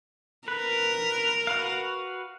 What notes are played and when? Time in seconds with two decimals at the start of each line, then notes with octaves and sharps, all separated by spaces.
0.48 A#4 B4
1.47 F#4 B4 F5